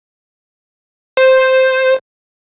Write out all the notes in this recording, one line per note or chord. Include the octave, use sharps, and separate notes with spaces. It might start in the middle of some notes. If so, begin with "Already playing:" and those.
C5